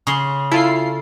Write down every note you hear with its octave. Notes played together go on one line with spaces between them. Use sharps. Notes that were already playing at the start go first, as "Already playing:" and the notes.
C#3 C6
E4 F4 A4 C7